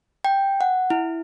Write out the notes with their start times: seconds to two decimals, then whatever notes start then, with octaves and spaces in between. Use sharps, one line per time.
0.25 G5
0.61 F#5
0.90 E4